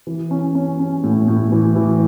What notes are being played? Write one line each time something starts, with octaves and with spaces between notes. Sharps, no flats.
E3
C#4
C#4
C#4
A2
A2
E3
E3